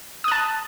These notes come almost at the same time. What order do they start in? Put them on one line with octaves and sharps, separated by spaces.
D#6 F#6 A5